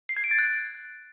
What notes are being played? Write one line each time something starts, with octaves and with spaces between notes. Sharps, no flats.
C7
G#6
D7
A6
F#6